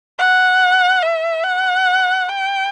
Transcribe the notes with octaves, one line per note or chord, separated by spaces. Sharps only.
F#5
E5
F#5
G5